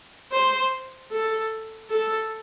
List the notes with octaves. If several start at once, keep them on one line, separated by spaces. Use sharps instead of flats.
C5
A4
A4